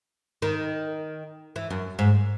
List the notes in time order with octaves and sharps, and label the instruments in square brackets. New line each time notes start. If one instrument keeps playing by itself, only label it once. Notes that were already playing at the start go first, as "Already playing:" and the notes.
[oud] D#3
E3
F#2
G#2